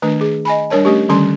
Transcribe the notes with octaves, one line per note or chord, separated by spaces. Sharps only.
D#3 A3 D4 B4
G#4
D#5 G#5 B5
G3 D4 A#4 C#5 A5
A3 C#4 G4
D3 D#3 G3 C#4 C6